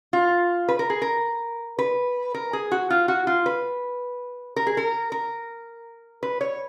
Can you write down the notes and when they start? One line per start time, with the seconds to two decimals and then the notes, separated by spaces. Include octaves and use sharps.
0.13 F4
0.69 B4
0.79 A#4
0.90 G#4
1.02 A#4
1.79 B4
2.34 A#4
2.53 G#4
2.72 F#4
2.90 F4
3.08 F#4
3.27 F4
3.46 B4
4.56 A#4
4.67 G#4
4.77 A#4
5.12 A#4
6.23 B4
6.41 C#5